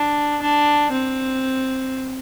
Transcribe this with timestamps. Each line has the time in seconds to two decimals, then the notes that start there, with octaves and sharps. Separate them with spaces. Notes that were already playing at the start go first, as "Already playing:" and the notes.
Already playing: D4
0.42 D4
0.92 C4